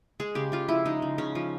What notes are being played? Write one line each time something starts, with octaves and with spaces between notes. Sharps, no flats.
G#3 G#4
C#3 G4
C#3 F4
F3 E4
G#3 D#4
C#3
C#3 C#4
F3